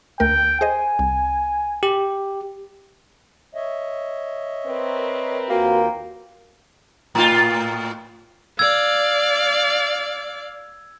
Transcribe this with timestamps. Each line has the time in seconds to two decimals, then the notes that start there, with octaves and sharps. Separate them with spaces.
0.20 D2 A3 A#4 G5
0.61 G#4 C5 D#5 G#5
0.99 C2
1.83 G4
3.55 C#5 D#5 E5
4.67 C4 A#4 B4
5.50 D#2 A#3 F4 F#4 G5
7.15 A2 F4
8.59 D5 F5 E6 G#6